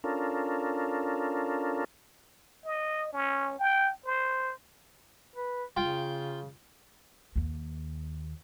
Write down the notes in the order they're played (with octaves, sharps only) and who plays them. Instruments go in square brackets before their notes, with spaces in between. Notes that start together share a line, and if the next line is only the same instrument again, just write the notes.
[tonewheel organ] C#4 D4 F4 A4 A#4
[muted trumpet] D#5
C#4
G5
C5
[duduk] B4
[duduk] C#3 [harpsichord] F4 G5
[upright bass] D#2 A#3